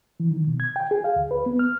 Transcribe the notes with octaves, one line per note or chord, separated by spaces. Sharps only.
E3
D#3
B2
G#6
G5
G#4
F5
D2
B4
B3
F6